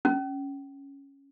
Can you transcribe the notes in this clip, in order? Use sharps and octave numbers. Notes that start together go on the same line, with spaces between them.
C#4